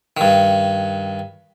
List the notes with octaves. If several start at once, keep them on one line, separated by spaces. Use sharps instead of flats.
G2 D#3